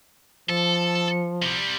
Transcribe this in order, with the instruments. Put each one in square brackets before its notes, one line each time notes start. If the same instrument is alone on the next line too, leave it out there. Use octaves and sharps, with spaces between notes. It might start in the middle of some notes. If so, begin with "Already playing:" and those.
[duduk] F3 [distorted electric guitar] A4
[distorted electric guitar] C3 G3